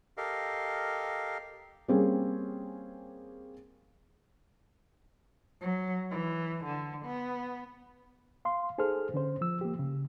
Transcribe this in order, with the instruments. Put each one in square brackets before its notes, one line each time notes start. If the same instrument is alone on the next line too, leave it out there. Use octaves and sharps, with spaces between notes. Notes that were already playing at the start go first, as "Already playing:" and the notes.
[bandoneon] G4 A4 A#4 D#5 F5
[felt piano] G3 A#3 C4 C#4 G#4
[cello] F#3
E3
D3
B3
[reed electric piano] F5 C6
D#4 G#4 A4 C5 F6
D3 C#4 C5
F3 E6
A#3 G4
C#3